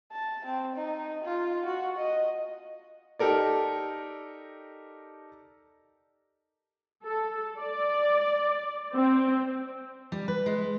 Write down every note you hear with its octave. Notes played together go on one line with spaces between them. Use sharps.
A5
C4
D#4
F4
F#4
D#5
D#4 G4 A4 A#4 D5
A4
D5
C4
G3
B4
G#3